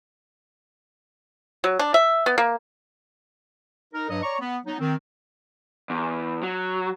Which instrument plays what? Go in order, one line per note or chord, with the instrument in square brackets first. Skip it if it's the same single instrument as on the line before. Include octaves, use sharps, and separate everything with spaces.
[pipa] F#3
D4
E5
B3
A#3
[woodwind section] D#4 A#4
G2 F#3 D#5
C#5 D5 A#5 C#6
B3
F#3 B3 D#4
D#3 C4
[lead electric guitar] E2
F#3